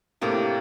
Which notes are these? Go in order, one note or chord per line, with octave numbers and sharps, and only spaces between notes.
A2 C3 A#3 D4 G4